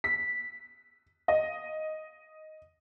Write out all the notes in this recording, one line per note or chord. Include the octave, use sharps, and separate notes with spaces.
B6
D#5